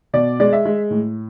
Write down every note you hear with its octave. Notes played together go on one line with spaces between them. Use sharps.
B2 D5
G#3 D5
E5
G#3
A2